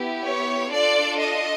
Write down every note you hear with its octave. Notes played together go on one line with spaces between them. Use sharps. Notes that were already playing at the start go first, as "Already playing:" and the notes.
Already playing: B3 E4 G4
C#5
D4 F4 A4 D5
D#5